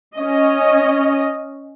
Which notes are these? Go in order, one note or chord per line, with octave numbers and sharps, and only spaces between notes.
C#4 D#5